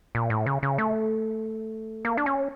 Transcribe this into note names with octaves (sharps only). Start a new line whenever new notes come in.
A#2
A2
C#3
C#3
A3
A#3
D4
C#4